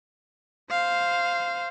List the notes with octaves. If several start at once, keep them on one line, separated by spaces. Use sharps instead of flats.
C5 F5